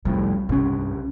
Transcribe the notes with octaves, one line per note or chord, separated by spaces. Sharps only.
C2 F2 A2 G3
C2 G2 C3 C#4